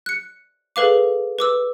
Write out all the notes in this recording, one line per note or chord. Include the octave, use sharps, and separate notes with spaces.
F#6 C#7
G#4 A4 B4 F5 D6
B4 D6 E6